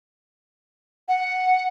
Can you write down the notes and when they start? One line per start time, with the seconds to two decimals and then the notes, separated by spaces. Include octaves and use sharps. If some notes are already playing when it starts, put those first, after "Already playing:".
1.08 F#5